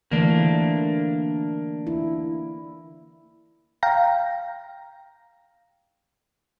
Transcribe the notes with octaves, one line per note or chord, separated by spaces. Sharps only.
D3 E3 A3 A#3 D4
E4
F5 G5 A#5 A#6